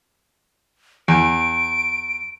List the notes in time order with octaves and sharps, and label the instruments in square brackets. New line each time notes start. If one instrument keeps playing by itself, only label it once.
[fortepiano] E2 [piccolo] D7